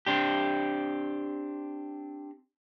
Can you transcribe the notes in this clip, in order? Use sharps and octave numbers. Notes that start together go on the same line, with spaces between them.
C4 D4 G4